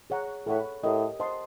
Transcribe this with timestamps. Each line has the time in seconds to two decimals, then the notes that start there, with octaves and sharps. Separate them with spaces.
0.10 G#4 C#5 F#5 A#5
0.47 A2 A4 C#5 F#5 B5
0.83 A2 G4 A#4 D#5
1.20 C5 D#5 F#5 A5 C6